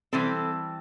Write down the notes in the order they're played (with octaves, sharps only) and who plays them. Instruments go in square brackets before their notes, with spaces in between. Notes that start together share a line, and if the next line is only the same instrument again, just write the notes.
[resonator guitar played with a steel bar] E3 G3 C4 A4